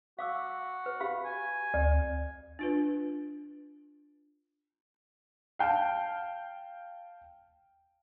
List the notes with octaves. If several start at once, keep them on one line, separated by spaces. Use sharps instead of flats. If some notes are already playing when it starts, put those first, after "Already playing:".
F#4 F5 D6 E6
B4
G4 F5 B5
G#5
D2
D4 F4 B4
F5 G5 A5